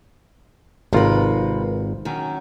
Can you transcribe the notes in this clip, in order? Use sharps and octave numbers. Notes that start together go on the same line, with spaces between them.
G#1 C3 F4 A#4 B4
F#2 D#3 C#4